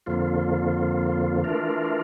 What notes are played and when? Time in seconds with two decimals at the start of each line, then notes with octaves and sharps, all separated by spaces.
0.06 F2 D3 F3 A#3 F4
1.44 E3 A3 D4 F4 A#4